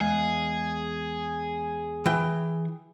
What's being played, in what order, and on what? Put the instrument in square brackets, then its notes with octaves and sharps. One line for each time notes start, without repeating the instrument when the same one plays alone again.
[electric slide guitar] E2 G#3 F5 [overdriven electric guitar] G#4
[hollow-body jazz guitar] E3 G5